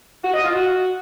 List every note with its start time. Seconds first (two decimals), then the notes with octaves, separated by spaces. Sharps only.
0.24 F#4
0.34 D#5
0.44 F4
0.55 F#4